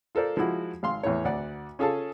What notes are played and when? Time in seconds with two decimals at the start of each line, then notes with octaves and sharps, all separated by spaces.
0.15 F4 A4 A#4 C5 D5
0.37 F3 G#3 E4 F#4
0.83 G#1 F5 C6
1.03 E2 A2 C#5
1.25 D2 D5 F#5
1.79 C#4 F4 G#4 A4 F5 A5